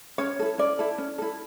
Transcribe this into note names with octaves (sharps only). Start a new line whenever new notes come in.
C#4 C#5
E4 A4
C#4 D5
E4 A4
C#4
E4 A4